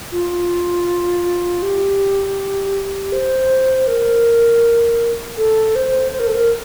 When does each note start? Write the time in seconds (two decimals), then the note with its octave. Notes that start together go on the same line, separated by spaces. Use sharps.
0.12 F4
1.62 G4
3.12 C5
3.87 A#4
5.37 A4
5.75 C5
6.12 C5
6.19 A#4
6.27 A4
6.35 A#4